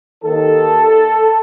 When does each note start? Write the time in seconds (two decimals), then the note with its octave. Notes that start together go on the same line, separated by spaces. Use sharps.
0.23 D#2 D#3 A4